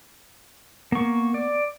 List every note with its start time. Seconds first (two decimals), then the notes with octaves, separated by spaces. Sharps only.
0.92 A#3 B3 C#6
1.34 D5